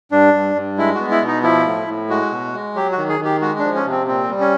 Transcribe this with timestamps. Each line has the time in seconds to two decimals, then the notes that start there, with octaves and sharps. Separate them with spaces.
0.12 G2 D4
0.34 G2
0.55 G2
0.78 G#3 E4
0.95 B3 F#4
1.11 E4
1.22 B2
1.27 D#4
1.43 F3 E4
1.66 A2
1.88 A2
2.09 G#3 F#4
2.31 B2
2.54 G#3
2.75 F#3 G4
2.92 F#4
2.98 D#3
3.09 G#4
3.20 D#3
3.25 G4
3.41 G#3 F#4
3.59 D4
3.64 F3
3.75 C#4
3.86 C3
3.91 C4
4.07 A#2 C4
4.29 G3
4.40 C#4